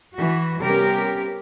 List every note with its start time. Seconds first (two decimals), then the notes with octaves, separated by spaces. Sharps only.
0.15 E3 F#4
0.59 C3 G3 B3 C#4 G4 A#4